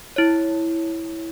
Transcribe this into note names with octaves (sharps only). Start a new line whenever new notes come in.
E4 C#5